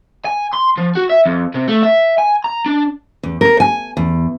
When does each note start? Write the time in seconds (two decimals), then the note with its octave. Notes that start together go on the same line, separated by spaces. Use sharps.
0.25 G#5
0.53 C6
0.77 F3
0.95 F#4
1.10 E5
1.26 F2
1.54 C3
1.67 A3
1.83 E5
2.18 G#5
2.44 A#5
2.66 D4
3.23 E2
3.41 A#4
3.60 G#5
3.97 E2